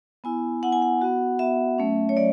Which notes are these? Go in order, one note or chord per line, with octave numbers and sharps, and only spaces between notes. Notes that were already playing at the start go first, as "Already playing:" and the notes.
B3 E4 G#5
B3 E4 F#5
G#5
F#5
B3 F#4
B3 F#4 E5
F#3 A3 C#4
C#5
F#3 A3 D5